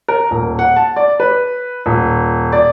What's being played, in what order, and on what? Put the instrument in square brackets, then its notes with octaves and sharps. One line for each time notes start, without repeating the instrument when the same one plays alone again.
[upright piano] A#4
D#1
F#5
A5
D5
B4
D#1
D5